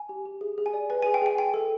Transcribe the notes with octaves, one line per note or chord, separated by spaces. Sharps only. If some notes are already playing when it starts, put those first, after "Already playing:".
Already playing: G#5
G4
G4
G#4
G#4
G#5
D5
B4 G#5
G#4 G#5
G5
G#4 G#5
G5
A4